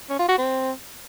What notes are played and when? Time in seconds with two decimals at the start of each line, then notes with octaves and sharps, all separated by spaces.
0.10 C#4
0.19 F4
0.29 F#4
0.38 C4